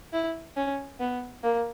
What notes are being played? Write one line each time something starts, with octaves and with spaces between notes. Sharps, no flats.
E4
C#4
B3
A#3